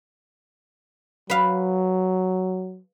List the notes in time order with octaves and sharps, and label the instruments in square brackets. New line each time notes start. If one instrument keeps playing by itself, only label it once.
[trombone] F#3 [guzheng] B4 F5